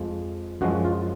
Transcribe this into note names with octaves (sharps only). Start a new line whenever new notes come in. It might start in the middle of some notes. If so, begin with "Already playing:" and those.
Already playing: F2 F3 G#3
F#2 F3 G#3 F#4
F4